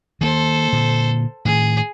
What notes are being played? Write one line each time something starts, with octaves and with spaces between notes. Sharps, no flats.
D#3 A#3 A4 C5
A#2 D3
A2 D#3 G#4